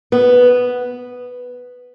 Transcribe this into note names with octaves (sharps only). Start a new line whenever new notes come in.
B3